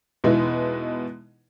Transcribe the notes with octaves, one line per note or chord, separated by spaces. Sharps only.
E2 B2 G#3 B3 D#4 E4